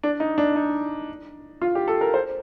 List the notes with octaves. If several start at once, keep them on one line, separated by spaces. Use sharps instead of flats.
D4
D#4
D4
D#4
F4
G4
A4
A#4
C5